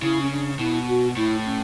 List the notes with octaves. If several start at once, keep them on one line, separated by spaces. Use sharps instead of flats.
C#3 E4
C#4
D4
B2 E4
F#4
A2 E4
C#4